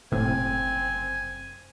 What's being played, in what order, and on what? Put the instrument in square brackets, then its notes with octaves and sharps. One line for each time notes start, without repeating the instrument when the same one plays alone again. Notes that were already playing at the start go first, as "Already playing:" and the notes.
[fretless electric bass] F#1 C3 [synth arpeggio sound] A2 [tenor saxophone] C4 [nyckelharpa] G#5